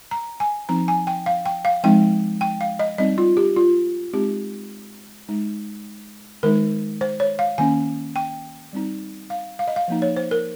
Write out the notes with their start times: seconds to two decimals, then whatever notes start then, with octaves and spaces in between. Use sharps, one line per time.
0.11 A#5
0.40 G#5
0.69 F3 C4 D#4 A#5
0.88 G#5
1.07 G5
1.26 F5
1.46 G5
1.65 F5
1.84 F3 G#3 C4 D#4 G5
2.41 G5
2.61 F5
2.79 D#5
2.98 G3 C4 D#4 D#5
3.18 F4
3.37 G4
3.56 F4
4.13 G#3 C4 D#4 G4
5.29 G#3 D#4
6.43 D#3 G#3 D#4 A#4
7.01 C5
7.20 C#5
7.39 F5
7.58 D#3 A#3 C#4 G#5
8.16 G5
8.73 G3 C4 D#4
9.30 F5
9.59 F5
9.68 D#5
9.76 F5
9.88 F3 A#3 D#4
10.02 C#5
10.16 C5
10.31 A#4